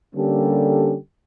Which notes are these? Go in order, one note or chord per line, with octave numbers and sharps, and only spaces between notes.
D3 G3 A#3 C#4 G4 A4